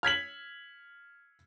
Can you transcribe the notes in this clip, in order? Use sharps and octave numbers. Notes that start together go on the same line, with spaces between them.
F6 G#6 B6 F#7